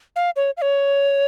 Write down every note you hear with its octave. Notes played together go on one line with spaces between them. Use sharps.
F5
C#5
F5
C#5